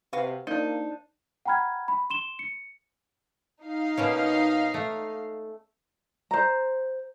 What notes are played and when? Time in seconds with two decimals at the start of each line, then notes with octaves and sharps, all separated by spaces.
0.13 C3 F#4 B4 F5
0.47 F3 A#3 D4 D#4
1.45 F#5 G5 A#5 B5 F6 G#6
1.88 B5
2.10 C6 E7 G7
2.39 C#7
3.63 D#4 F5
3.97 B2 A#3 C#4
4.74 A3
6.31 C5 A#5